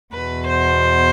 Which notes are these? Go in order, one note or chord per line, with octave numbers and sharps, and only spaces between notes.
E2 B2 B4
C5